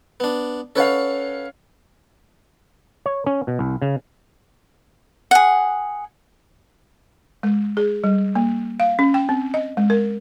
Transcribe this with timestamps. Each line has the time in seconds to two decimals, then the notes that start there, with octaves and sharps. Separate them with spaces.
0.20 B3 D4
0.76 C#4 A4 B4 C#5 F5 F#5
3.06 C#5
3.26 C#4
3.47 B2
3.59 C2
3.82 C#3
5.31 G#4 F#5
7.43 G#3
7.77 G#4
8.04 G3
8.35 A#3
8.80 F5
8.99 C#4
9.14 G5
9.29 C4
9.54 D#5
9.77 G#3
9.90 A#4